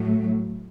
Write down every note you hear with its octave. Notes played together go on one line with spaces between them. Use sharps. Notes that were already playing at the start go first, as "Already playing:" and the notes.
Already playing: A2 F#3 A3